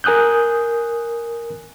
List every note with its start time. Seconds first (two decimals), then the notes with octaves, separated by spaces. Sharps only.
0.04 A#4 G#5 D#6 F#6 G6